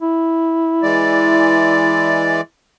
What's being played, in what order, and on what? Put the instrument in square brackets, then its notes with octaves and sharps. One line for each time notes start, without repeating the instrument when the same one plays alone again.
[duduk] E4
[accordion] E3 G#3 D5